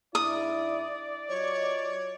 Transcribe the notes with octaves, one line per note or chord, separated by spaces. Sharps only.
G#2 D4 E4 D5 D#6
F#3 F4 C#5 D#5